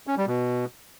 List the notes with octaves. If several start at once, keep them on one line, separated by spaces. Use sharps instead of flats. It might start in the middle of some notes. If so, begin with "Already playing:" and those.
C#4
G3
B2